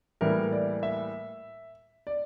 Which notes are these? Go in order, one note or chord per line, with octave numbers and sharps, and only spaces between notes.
A2 E3 G3 A#3 A#4
D5
E5
D5